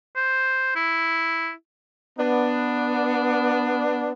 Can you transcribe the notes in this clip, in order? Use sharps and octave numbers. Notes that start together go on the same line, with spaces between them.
C5
E4
B3 D4